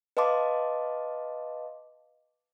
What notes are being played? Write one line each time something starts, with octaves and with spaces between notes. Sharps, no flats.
B4 D#5 F5 A5 C6 D6